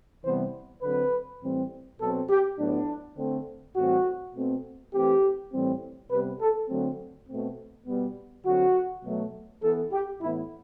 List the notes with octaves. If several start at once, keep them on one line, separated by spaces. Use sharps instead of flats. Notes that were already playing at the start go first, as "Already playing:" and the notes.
C3 E3 G3 B3 C5
D3 F#3 C4 B4
A2 E3 G3 C4
B2 F#3 C4 A4
G4
A2 F#3 B3 D4
D3 A3 C4
A2 E3 G3 C4 F#4
B2 A3 C4
E3 A3 C4 G4
A2 E3 G3 C4
C3 G3 B3 B4
A4
D3 F#3 A3 C4
B2 A3 C4
B2 G3 B3
D3 F#3 C4 F#4
B2 F#3 A3
E3 B3 A4
G4
A2 E3 B3 E4